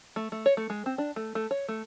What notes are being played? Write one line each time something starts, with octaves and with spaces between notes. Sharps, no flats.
A3
A3
C#5
A3
G#3
C4
D4
A3
A3
C#5
A3